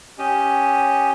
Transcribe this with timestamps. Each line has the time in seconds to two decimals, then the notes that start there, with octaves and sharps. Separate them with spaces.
0.19 C#4 G4 D#5